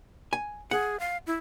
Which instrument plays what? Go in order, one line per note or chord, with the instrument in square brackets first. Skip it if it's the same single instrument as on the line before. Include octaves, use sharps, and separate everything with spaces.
[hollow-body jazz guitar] G#5
[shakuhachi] G#4 [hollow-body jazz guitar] F#5
[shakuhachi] F5
E4